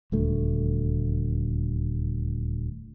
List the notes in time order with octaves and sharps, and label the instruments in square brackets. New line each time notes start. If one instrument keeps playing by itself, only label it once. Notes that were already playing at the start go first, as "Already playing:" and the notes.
[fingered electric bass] D#1 D2 A3